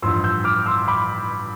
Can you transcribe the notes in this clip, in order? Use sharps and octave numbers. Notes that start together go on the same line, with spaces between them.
A1 G2 F3 C6 E6
E6 G6
D6 F6
C6 E6
B5 D6